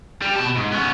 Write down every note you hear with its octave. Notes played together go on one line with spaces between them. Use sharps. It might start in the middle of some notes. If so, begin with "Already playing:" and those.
G3
B2 A5
G#2
B3 C#4